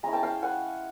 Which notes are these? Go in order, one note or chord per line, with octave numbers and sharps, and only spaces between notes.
G#3 C#4 E4 G#5 A#5
G5 A5
F5 G5
F#5 G#5